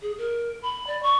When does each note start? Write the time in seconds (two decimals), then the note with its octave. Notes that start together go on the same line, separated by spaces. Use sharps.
0.02 G#4
0.18 A#4
0.62 B5
0.87 D5
1.03 C#6